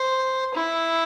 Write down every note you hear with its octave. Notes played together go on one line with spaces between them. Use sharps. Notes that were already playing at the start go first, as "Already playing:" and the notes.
Already playing: C5
E4